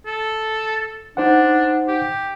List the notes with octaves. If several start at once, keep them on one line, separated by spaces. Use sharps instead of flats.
A4
D4 D#4 C5 F#5
G4